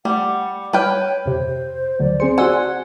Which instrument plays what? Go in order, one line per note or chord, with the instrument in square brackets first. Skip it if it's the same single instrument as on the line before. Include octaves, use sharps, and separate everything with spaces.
[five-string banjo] G3 [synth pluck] A3 [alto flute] F#5
[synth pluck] G3 F6 [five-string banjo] B4 G5 [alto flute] C#5
[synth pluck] F2 C3 [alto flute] C5
[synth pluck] D2 D3 F#3 [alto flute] D5
[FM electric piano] C4 G#4 C5 [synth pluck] C#7
[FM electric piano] F#4 G#5 [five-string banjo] F#5 [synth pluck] C6 E6 G#6